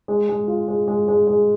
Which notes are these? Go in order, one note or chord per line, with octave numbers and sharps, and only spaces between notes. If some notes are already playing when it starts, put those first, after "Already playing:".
G#3
G#3
F4
G#3
G#3
G#3
G#3